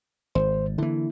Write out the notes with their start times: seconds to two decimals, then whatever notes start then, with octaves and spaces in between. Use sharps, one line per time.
0.35 G#1 C5
0.78 D3 E3 A#3 E4